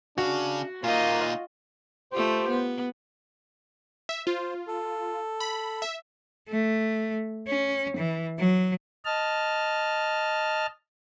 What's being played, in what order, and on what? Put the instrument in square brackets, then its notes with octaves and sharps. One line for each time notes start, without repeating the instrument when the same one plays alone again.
[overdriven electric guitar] C#3 F5 [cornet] D4 [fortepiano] F#4
[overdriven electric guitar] A#2 D#4 [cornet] A#3 [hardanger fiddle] F4 D#5
[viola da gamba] A3 F4 G4 [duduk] C5
[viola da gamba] B3
[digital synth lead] E5
[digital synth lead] F4 [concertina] C5
[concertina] A4
[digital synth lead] B5
E5
[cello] A3
C#4
E3
F#3
[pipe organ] D#5 A5 F6